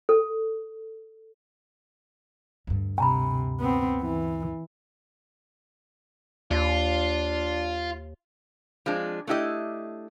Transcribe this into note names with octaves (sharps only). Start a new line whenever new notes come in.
A4
D2 G2
C3 G#5 A#5 B5
B3 C4
E3
D#2 D4 F4
F3 G#3 C4 D4
A3 D4 E4 G4 D#5